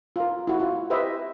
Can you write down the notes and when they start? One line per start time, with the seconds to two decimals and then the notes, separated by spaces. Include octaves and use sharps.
0.16 F4 A#4
0.47 E4 F#4
0.59 E4 F4
0.90 G4 B4 C5 D#5 E5